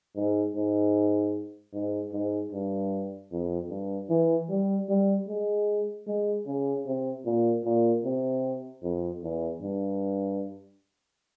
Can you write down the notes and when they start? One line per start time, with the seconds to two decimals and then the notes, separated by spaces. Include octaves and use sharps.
0.16 G#2
0.55 G#2
1.74 G#2
2.12 G#2
2.52 G2
3.32 F2
3.70 G2
4.10 E3
4.49 G3
4.89 G3
5.28 G#3
6.07 G#3
6.47 C#3
6.86 C3
7.25 A#2
7.65 A#2
8.05 C3
8.83 F2
9.23 E2
9.62 G2